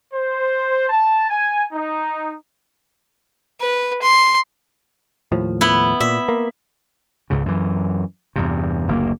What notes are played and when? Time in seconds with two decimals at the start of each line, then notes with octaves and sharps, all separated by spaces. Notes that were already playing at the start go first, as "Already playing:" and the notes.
0.12 C5
0.90 A5
1.30 G#5
1.72 D#4
3.61 B4
4.02 C6
5.32 D#2 A2 F3
5.61 B3 E4
6.00 A#2 E5
6.28 A#3
7.30 C#2 G#2 C#3
7.46 F#2 E3
8.36 E2 G2 C3
8.88 F#1 D2 A#3